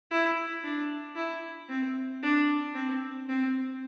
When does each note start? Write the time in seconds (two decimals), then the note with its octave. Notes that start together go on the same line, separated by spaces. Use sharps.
0.11 E4
0.64 D4
1.16 E4
1.69 C4
2.23 D4
2.75 C4
3.29 C4